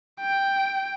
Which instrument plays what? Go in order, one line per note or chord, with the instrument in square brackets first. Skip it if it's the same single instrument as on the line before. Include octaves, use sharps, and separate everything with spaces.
[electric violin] G5